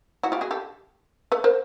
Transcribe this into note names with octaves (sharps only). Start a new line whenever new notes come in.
E4 F#4
F4 G4
F#4 G#4
G4 A4
A4 B4
A#4 C5